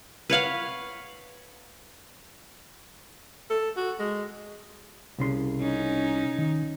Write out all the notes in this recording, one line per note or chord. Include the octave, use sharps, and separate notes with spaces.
B4 C#5 F5 F#5
A4
F#4
G#3
C2 C#3 C6
C#4 D#4
D#3